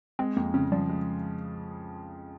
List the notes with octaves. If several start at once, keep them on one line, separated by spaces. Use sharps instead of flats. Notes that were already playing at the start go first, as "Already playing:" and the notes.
G#3 C4
F2 A#3
C#3 C4
F3 G3
G#3